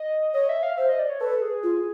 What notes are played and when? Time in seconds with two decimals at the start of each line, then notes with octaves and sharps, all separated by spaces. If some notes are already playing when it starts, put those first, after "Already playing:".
Already playing: D#5
0.34 C#5 D#5
0.49 E5
0.63 F5
0.78 C5 E5
0.89 D#5
0.99 D5
1.10 C#5
1.21 A4 B4
1.42 G#4
1.63 F4